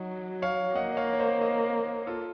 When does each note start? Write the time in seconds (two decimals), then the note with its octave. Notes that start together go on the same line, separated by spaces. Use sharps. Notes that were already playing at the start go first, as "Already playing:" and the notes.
Already playing: F#3 D#4 F#4
0.42 C#5 F5
0.75 A#3 D#5 F#5
0.92 D#5
0.97 C#5 F5
1.13 C#5
1.19 C5 D#5
1.41 C5 D#5
2.07 F4 A4